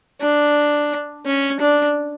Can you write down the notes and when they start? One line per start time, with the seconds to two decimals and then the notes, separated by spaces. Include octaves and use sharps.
0.21 D4
1.26 C#4
1.60 D4